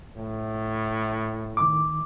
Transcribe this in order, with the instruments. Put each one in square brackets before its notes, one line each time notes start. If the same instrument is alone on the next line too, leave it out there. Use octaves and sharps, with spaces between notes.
[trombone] A2
[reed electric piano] D#3 D6